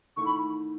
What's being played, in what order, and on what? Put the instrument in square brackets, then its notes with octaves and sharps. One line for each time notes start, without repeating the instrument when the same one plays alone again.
[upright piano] G#2 D#3 A3 E4 [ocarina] C#6
[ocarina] B5